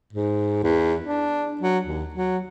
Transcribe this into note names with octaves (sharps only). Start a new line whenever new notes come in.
G#2
E2
D4
F#3
D#2
F#3